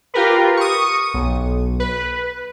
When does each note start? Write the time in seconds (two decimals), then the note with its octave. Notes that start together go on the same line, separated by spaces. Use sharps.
0.14 F4 G4 A#4 B4
0.57 C#6 D#6
1.14 B1
1.80 B4